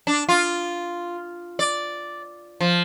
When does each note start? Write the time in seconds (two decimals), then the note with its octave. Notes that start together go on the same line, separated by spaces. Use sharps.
0.07 D4
0.29 F4
1.59 D5
2.61 F3